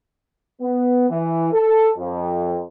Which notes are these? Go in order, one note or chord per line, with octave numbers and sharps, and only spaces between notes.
B3
E3
A4
F2